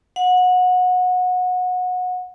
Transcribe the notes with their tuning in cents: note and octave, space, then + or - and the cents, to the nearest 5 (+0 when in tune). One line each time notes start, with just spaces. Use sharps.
F#5 -25